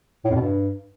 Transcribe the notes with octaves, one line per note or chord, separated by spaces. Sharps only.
A2
F2
B2
G2